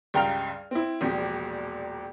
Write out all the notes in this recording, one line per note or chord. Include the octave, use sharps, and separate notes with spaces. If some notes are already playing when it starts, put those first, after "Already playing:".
C#2 G2 G5 A#5 F6 F7
C4 E4
E1 A#1 C3